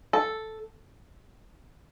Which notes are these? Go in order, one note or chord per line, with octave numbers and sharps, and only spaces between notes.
A4